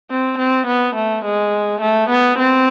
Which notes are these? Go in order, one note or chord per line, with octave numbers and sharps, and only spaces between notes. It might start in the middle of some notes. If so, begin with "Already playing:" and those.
C4
C4
B3
A3
G#3
A3
B3
C4